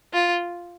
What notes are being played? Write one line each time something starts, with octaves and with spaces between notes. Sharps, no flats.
F4